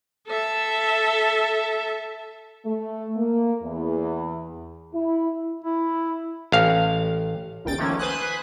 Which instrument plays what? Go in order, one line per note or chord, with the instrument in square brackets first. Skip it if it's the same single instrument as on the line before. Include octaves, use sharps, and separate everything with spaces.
[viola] A4 E5
[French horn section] A3
A#3
E2
E4
[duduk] E4
[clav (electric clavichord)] A1 F5
[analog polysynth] G1 C#2 G5 A6 D7
D#3 F3 A3 A#3 C#4
B4 C5 G#5 D#6 F#6